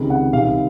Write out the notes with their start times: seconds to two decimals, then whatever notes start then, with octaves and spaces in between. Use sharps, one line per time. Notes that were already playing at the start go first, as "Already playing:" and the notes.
Already playing: C#2 C3 D#3
0.10 F#5
0.33 C2 C3 D#3 F5